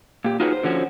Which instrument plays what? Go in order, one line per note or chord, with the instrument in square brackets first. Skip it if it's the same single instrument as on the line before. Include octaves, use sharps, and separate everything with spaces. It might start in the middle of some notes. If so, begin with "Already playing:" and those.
[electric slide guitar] A#2 G4
D#4 F4 F#4 G#4 B4 C#5
C5
D3 F3 C#4 F#4 C5